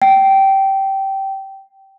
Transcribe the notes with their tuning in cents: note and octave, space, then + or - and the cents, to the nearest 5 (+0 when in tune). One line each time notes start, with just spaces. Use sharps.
G5 -15